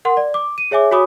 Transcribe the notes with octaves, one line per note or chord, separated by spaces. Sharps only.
A#4 F#5 C6
D5
D6
D#7
G#4 C#5 E5 G#5 D6
F#4 C#5 G#5 B5 D6 D#6